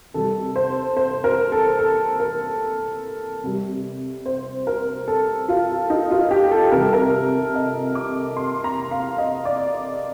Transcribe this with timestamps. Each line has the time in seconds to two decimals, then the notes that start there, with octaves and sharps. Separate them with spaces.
0.14 C3 D#3 G3 A4
0.56 C5
0.97 C5
1.24 A#4
1.52 A4
1.79 A4
2.20 A#4
3.44 C3 G3
4.26 C5
4.67 A#4
5.08 A4
5.49 F4
5.90 D#4
6.11 F4
6.31 G4
6.51 A4
6.72 C3 D#3 G3 A#4
6.83 A4
6.93 A#4
7.55 D#5
7.95 D6
8.37 C6
8.64 A#5
8.91 F5
9.18 D#5
9.45 D5